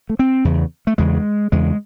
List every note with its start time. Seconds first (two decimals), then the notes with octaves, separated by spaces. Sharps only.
0.09 A3
0.19 C4
0.45 E2 C#3
0.87 A3
0.98 E2 C#3 G#3
1.52 E2 C#3 G#3